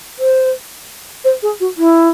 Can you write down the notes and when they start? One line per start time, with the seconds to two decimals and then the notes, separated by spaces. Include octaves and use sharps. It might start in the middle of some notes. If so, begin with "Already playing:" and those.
0.19 C5
1.25 C5
1.43 G#4
1.60 F#4
1.77 E4